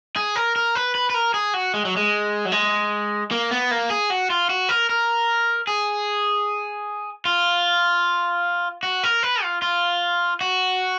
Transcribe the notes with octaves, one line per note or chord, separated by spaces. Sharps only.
G#4
A#4
A#4
B4
B4
B4
A#4
G#4
F#4
G#3
F#3
G#3
F#3
G#3
A#3
B3
A#3
G#4
F#4
F4
F#4
A#4
A#4
G#4
F4
F#4
A#4
B4
F4
F4
F#4